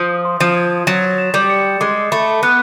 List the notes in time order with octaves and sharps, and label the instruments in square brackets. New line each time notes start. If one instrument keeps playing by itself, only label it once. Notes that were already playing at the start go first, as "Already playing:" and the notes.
Already playing: [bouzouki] F3 [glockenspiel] D#6
[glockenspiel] C6
[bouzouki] F3
[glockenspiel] G#6
[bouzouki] F#3 [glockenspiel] A6
[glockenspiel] E7
[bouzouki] G3
[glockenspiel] C#7
[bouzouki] G#3 [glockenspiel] D6
[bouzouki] A3 [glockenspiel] B5
[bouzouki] B3 [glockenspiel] F#6